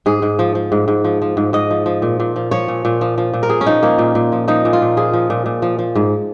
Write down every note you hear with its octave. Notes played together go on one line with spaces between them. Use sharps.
G#2 G#4
G#2
F3
F3
G#2
G#2
F3
F3
G#2
G#2 D#5
F3
F3
A#2
A#2
F3
F3 C#5
A#2
A#2
F3
F3
A#2
A#4
A#2 G#4
C#4
F3 D#4
F3 A#3
A#2
A#2
F3
F3 D#4
A#2
F4
A#2
F3 G#4
F3
A#2
A#2
F3
F3
G#2